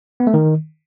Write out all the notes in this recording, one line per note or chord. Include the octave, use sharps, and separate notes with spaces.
B3
A3
D#3